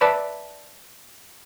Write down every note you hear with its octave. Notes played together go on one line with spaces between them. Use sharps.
B4 D5 E5 A5 B5